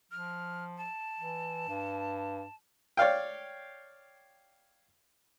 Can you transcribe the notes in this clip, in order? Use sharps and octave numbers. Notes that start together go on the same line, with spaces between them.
F3 F6
A5
E3
G2
C#5 D5 F5 G5